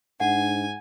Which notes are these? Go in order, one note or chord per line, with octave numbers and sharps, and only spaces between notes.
G#2 D4 F#5 G#5